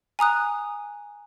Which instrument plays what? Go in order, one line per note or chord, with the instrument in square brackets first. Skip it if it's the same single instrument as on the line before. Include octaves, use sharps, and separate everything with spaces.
[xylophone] G#5 A#5 D#6 F#6